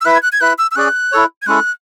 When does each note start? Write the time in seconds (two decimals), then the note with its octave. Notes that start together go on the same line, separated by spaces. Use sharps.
0.01 E6
0.05 E4 B4 E5 F#6
0.15 G#6
0.23 F#6
0.32 G#6
0.41 E4 B4 E5 F#6
0.58 E6
0.71 E6
0.76 C#4 G#4 D5 F#6
1.12 E4 A4 C#5
1.42 G#6
1.46 G#3 C#4 E4 A4 F#6